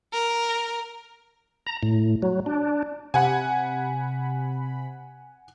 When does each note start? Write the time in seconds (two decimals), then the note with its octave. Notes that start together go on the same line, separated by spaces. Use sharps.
0.13 A#4
1.67 A#5
1.83 A2
2.22 F#3
2.46 D4
3.14 C3 F#5 G#5 B5